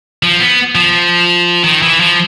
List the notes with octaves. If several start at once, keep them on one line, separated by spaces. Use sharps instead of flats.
F3
B3
F3
D#3
E3
F3